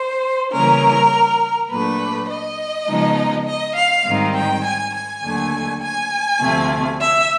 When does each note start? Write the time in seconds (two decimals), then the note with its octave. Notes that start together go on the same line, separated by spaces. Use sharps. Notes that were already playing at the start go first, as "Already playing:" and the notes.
Already playing: C5
0.51 C#3 E3 G3 A#3 C#4 A#4
1.69 A#2 F#3 A3 D4 B4
2.28 D#5
2.87 C#3 F3 G#3 B3 D#4
3.46 D#5
3.75 F5
4.04 G#2 D#3 G3 C4 D#4
4.34 G5
4.63 G#5
4.93 G#5
5.22 D#2 D3 F#3 A3 D4
5.81 G#5
6.40 D2 C3 F3 A3
6.99 E5